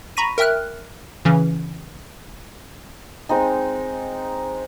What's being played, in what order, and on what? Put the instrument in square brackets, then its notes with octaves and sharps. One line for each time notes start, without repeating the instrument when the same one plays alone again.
[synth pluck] A#5 B5 C#6 A#6 B6 D#7
A#4 E5 G5 F6 F#6
C#3 E3 C#4
[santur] G#3 C4 D#4